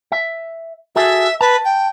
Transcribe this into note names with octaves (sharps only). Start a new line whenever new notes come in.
E5
F#4 G#4 A4 E5
B4 A5
G5